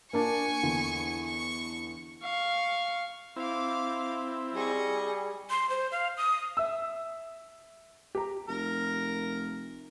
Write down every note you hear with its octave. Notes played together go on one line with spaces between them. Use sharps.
A#3 D4 G#5 C#6
E2 D3
C#6
F5 C#6
C4 E4 F5 D6
G3 G#4 D#5 C#6
C6
C5
F5
D#6
E5 E6
G4 A#5
F1 A#4